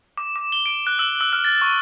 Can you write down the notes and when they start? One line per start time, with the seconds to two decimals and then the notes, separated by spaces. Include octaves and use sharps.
0.18 D6
0.36 D6
0.52 G7
0.66 D7
0.87 F#6
0.99 E6
1.21 E6
1.33 F6
1.45 A6
1.62 C#6